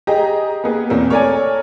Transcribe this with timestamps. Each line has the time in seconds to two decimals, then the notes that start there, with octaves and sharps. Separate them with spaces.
0.07 G4 G#4 D#5 A#5
0.64 A#3 B3 G#4
0.90 E2 A#3 C4
1.10 A3 A#4 C#5 D5 G#5